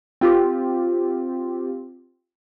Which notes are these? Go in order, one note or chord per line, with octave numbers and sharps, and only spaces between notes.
C4 F4 G4